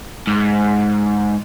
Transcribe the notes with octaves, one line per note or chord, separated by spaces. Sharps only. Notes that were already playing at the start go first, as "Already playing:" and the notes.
G#2